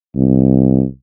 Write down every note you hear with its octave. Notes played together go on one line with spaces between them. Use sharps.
C2